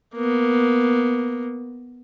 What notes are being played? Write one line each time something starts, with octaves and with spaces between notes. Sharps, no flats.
A#3 B3